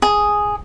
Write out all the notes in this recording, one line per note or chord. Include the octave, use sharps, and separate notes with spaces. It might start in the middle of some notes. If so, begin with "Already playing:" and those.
G#4